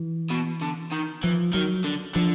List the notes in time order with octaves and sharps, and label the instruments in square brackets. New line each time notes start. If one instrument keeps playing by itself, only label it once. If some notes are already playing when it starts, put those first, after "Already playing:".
Already playing: [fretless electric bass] E3
[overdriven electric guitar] B2
D3
D#3
[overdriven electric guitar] E3 [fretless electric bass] F3
[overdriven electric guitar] D#3 [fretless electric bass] F#3
[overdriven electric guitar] D3
[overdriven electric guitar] D3 [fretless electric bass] F3